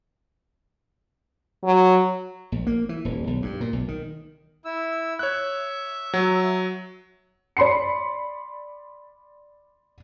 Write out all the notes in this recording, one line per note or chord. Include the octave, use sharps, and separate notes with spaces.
F#3
A#1
A#3
E3
D#1
B1
G2
A#2
B1
D#3
E4 E6
C#5 E5 F#6
F#3
D5 B5 C6 C7 C#7